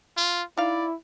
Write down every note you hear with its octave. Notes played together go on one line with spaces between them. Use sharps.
F4
D#4 E4 D5 F5